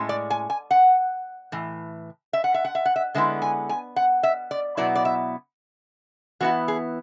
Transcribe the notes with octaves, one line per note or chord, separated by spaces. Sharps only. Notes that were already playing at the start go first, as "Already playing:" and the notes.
Already playing: A2 G#3 C#4
D5
G#5
G#5
F#5
A2 E3
E5
F#5
E5
F#5
E5
F#5
E5
D3 G#3 B3 E4 E5
G#5
G#5
F#5
E5
D5
B2 F#3 B3 E4 D5
D5
E5
E3 B3 E4 F#4
G#4